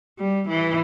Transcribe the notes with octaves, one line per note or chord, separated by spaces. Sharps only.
G3
E3